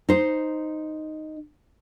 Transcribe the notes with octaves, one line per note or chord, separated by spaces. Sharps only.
D#4 C5